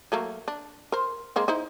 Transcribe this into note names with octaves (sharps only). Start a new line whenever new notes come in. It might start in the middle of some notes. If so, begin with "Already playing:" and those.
F#3 A3 A#3
D4
A#4 C5
G#3 A#3 C4
D#4 E4 C5